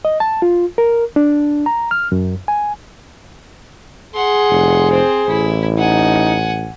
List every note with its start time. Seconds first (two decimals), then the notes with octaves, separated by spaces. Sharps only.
0.05 D#5
0.20 A5
0.42 F4
0.78 A#4
1.16 D4
1.66 A#5
1.91 F6
2.12 F#2
2.48 G#5
4.15 G#4 F#5 C6
4.50 F1
4.91 C4 C5
5.28 A1 E4
5.78 D#4 F#5 G#5